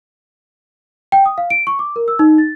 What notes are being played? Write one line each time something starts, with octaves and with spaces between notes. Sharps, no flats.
G5
D#6
F5
D7
C#6
D6
A#4
E6
D#4
A6